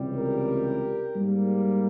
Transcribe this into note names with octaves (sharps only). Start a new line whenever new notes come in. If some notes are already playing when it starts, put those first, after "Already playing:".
Already playing: C#2 C3 E3 G3
G4 A#4
G#2 G3 A#3